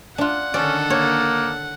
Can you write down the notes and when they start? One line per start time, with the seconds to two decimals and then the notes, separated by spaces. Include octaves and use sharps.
0.18 D4 F4 F#5
0.54 D3 D#3 C#4 A4 D5
0.90 A#3 C#5